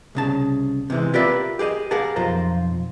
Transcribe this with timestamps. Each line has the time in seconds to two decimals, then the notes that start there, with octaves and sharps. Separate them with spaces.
0.15 C2 C#3 A5
0.90 C3 E3 G#3
1.14 F4 G4 A#4 B4 D5 E5
1.59 G4 G#4 C5 D#5
1.91 G4 G#4 A#4 F5 F#5 A5
2.16 B1 F2 F4 C5 A#5